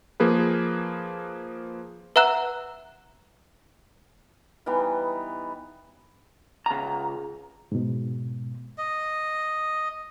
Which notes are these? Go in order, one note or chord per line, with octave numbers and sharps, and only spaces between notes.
F3 A#3 G#4 B4
B4 E5 F#5 A#5 E6 F#6
E3 G3 B3 D#4
C#2 A#5
G#2 B2
D#5